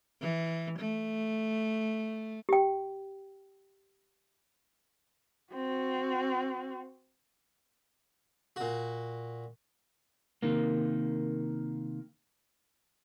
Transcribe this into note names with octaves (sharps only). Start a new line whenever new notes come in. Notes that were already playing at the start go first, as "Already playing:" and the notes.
E3
A3
G4 G5
C4 F#4
A#2 F#4
C3 D#3 A#3